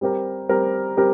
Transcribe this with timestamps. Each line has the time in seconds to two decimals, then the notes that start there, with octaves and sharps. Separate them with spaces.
0.01 G3 C4 G4 A#4
0.49 G3 C4 G4 A#4
0.97 G3 C4 G4 A#4